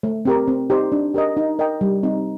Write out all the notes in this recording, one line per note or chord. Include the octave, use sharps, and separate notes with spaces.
A3
C4 G4 A#4
C4
D#4 G4 C5
D4
G4 A#4 D#5
D#4
A#4 D#5 G5
G3
C4 D#4